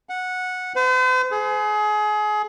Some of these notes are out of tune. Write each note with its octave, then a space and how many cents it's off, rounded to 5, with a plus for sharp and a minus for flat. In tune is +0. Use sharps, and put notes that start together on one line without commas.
F#5 -15
C5 -45
G#4 +25